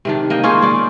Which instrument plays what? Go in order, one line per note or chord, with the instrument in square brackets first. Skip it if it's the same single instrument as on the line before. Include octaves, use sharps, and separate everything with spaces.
[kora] C3 D#3 D4
A#3 D#5 G5
C#4 D#4 F4 G#4
G#3 C#4 D5